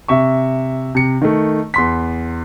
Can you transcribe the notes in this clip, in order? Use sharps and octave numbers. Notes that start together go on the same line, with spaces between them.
C3 E5 C#6
C3 C#7
D#3 A3
E2 C6 B6